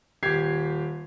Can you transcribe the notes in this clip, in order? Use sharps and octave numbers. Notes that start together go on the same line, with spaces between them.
D#1 G4 G#6 C7